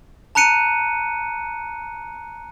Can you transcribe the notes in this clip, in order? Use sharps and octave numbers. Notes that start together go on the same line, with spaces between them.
A5 A#5 F#6 C#7 D#7